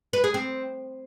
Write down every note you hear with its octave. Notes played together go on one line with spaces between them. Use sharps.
B4
G#4
C4